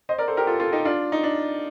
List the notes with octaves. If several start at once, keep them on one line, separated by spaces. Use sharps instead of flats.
C5 D#5
A#4 D5
A4 C5
G4 A#4
F4 A4
F4 A4
D#4 G4
D4 F4
D#4
D4